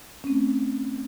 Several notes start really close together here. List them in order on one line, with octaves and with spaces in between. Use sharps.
C#4 C4 A3